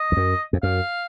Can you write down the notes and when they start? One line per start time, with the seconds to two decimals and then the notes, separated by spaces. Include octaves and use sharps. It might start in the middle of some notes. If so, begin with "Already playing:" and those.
Already playing: D#5
0.12 F2
0.17 F#2
0.53 F2
0.63 F#2 F5